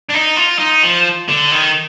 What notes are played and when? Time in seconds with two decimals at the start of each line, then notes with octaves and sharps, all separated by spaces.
0.09 D4
0.14 D#4
0.36 F4
0.59 D#4
0.83 F3
1.28 D3
1.52 D#3